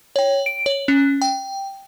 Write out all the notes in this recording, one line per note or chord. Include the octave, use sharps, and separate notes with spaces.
C#5 G5
D7
C#5
C#4
G5